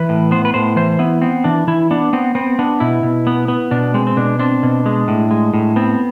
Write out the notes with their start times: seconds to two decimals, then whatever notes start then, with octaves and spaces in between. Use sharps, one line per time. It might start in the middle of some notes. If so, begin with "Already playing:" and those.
Already playing: E3 B4
0.09 A2
0.31 B3 C5
0.45 B4
0.54 A2 C5
0.76 E3 C5
0.99 B3 E4
1.22 B3 C4
1.44 E3 D4
1.67 E3 E4
1.91 B3 D4
2.13 B3 C4
2.35 B3 C4
2.59 B3 D4
2.80 B2 E4
3.03 B2
3.27 B3
3.48 B3
3.71 B2 D4
3.94 G#3 C4
4.07 C4
4.17 B2 D4
4.39 C4 D4
4.63 B2
4.86 G#3
5.08 A2
5.31 G#3
5.54 A2
5.76 B3 C4